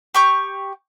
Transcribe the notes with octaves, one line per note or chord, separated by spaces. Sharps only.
G4 C#6 G6